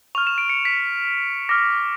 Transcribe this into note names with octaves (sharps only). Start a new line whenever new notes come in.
C#6 F6 F7
E7
D7
C#7
B6
D6 F6 A#6